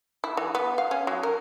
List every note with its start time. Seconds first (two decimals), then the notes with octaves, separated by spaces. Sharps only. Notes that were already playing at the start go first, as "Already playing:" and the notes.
0.24 E4
0.37 E3
0.55 B3
0.78 F5
0.91 C#4
1.07 F#3
1.23 A#4